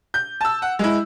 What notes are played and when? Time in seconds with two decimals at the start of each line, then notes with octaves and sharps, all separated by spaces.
0.14 G6
0.41 A5 E6
0.62 F#5
0.79 G#3 E4